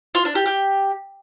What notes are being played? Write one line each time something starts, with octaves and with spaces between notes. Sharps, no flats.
F4
D4
G4
G4